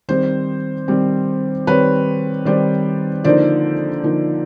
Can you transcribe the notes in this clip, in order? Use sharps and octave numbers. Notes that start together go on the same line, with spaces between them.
D#3 G3 C4 C5
D#3 G3 C4
D#3 G3 C4 B4 C#5
D#3 G3 C4 C5 D5
D3 F3 A#3 D#4 C5 D5
D3 F3 A#3 D#4